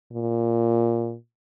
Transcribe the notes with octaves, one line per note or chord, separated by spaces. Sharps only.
A#2